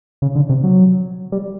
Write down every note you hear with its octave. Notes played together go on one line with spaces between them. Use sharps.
C#3
D3
C3
F#3
G3